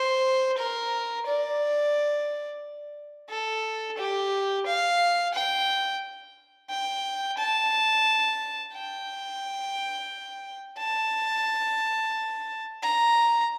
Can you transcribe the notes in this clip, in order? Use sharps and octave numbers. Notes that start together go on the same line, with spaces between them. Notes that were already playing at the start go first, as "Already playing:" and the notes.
Already playing: C5
A#4
D5
A4
G4
F5
G5
G5
A5
G5
A5
A#5